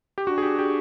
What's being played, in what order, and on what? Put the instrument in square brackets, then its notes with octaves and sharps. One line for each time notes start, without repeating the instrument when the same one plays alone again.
[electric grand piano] G4
[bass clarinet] D4 [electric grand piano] F#4
[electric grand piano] G#4
G4
G4